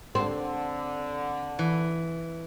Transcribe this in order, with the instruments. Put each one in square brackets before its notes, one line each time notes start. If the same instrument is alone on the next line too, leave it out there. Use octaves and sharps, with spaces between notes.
[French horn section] D3 [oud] C4
[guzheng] E3